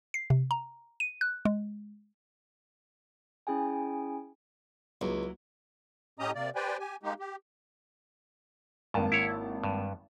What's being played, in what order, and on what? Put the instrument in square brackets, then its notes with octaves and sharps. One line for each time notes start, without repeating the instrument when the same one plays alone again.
[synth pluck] C7
C3
A#5
D#7
F#6
G#3
[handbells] C#4 E4 G#4 G5 G#5
[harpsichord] C#2 [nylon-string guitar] F#3 A#3 E4
[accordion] A2 C#4 G4 D#5 A#5 D#6
C3 A#3 D5
G4 B4 C5 D5 G5 G#5
G4 G#5
G#3 A#3 D#4 G4
G4
[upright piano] G#1 A#3 A5 [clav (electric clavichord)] G2
[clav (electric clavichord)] E4 C#5
G2